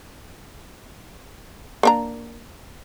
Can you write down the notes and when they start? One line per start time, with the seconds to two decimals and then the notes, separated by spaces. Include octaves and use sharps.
1.83 A#3 D4 A#5